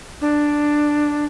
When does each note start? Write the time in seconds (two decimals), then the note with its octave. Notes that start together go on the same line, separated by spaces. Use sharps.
0.21 D4